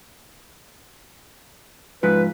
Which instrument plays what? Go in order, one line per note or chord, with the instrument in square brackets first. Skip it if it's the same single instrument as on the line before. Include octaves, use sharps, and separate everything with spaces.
[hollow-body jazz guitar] G#2 F3 [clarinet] B4